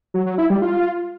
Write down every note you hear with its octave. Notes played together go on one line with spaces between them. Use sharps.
F#3
F#3
E4
G3
F4